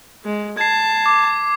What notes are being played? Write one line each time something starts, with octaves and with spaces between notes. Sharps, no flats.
G#3
A5 G#6 C7
D6